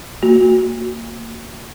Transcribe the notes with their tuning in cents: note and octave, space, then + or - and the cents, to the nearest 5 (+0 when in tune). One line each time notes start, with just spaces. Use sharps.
A#3 -20 F#4 +0